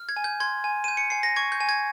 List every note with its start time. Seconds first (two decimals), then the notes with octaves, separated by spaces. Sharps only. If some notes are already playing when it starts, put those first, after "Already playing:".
Already playing: F6
0.09 G#6
0.16 G#5
0.24 G6
0.40 C6 G#6
0.64 G#5
0.84 G6 D#7
0.97 C#7
1.10 G#5 C7
1.23 A#6
1.36 C#6 G#6
1.52 G6
1.60 G#5
1.69 G#6